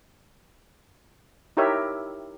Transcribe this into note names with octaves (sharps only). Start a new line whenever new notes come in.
D#4 E4 G4 A#4 C#5 E5